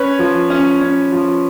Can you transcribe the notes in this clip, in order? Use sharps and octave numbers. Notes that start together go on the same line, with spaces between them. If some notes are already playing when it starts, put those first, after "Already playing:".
Already playing: C#4 B4 C#5
F3
C#4
C#4
F3